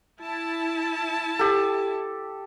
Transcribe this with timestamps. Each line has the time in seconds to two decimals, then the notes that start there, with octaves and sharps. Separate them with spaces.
0.19 E4 A5
1.39 G4 A4